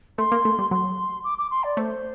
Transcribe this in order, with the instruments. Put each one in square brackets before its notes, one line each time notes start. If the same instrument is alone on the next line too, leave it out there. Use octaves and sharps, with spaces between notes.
[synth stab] A3 [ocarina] C6
[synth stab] A#3
A3
G3
[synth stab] F#3 [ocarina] C6
[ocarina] D6
D6
C6
D5
[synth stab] A3 [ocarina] C5